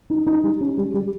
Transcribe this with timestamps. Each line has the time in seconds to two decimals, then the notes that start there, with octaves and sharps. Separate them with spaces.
0.10 D#4
0.27 D#4
0.43 G3
0.61 C#4
0.77 G3
0.94 G3